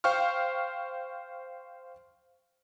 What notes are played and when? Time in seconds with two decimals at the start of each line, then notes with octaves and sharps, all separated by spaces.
0.04 C5 F5 G5 C#6 F6